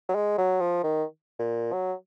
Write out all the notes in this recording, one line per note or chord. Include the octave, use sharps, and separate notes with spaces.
F#3
G#3
F#3
F3
D#3
A#2
F#3